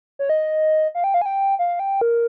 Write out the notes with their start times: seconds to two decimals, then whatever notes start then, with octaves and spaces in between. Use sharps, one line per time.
0.19 C#5
0.30 D#5
0.95 F5
1.04 G5
1.14 F5
1.22 G#5
1.26 G5
1.59 F5
1.79 G5
2.01 A#4